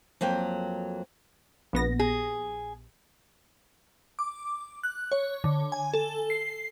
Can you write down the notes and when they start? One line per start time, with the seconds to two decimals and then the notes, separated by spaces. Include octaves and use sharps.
0.21 F2 F#3 A#3 G5
1.73 A#1 B3 A#6
1.99 G#4
4.19 D6
4.83 F#6
5.12 C#5
5.44 D3
5.72 G#5
5.94 A4
6.30 C7